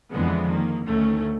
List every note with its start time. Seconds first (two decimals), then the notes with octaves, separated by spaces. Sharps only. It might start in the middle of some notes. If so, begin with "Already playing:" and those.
0.12 F2 D3 E3 F3 G#3 B3
0.50 D#3 A#3
0.86 D2 D#3 A3 C#4